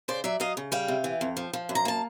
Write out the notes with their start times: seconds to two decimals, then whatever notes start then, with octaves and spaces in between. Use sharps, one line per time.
0.08 C#3 C5 D5
0.24 F#3 D5 E5
0.40 F#3 D#5 F5
0.57 C#3
0.72 G3 F5 G5
0.88 C3
1.04 E3
1.21 F2
1.37 F3
1.53 F3
1.69 F#2
1.75 A#5
1.85 A#3 A5